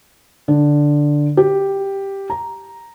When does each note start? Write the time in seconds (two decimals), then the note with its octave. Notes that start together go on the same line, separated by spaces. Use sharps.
0.48 D3
1.37 G4
2.30 A#5